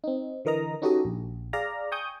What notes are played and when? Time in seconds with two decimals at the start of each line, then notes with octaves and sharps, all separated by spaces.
0.04 C4 D#4
0.45 D3 E3 A#4 D#5 A#5
0.82 C#4 D#4 F#4 G4 A4 D#5
1.05 A#1
1.53 G#4 D5 F5 A#5
1.92 G5 G#5 C#6 D#6 G6